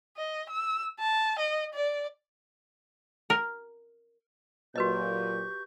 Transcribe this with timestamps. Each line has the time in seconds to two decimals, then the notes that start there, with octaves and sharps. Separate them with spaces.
0.17 D#5
0.50 E6
0.99 A5
1.39 D#5
1.74 D5
3.30 A#4
4.76 A#2 F#3 F#4 G4 B4 D#5 C#6 G6